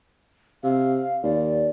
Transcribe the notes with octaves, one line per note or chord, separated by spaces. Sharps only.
C3 F5
D#2 D5